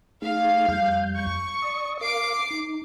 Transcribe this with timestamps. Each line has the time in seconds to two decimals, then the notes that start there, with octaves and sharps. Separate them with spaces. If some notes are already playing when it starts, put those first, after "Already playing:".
0.22 A3 D#4 G#4 F5
0.68 F2 G3 G6
1.17 C#6
1.62 D5 D#6
2.01 A#4 F5 D6 C7 D7
2.50 D#4